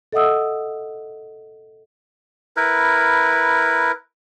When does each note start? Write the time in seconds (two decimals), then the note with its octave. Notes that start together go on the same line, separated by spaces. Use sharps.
0.12 A4 D#5 E5 F#5 D#6 E6
2.56 E4 A#4 B4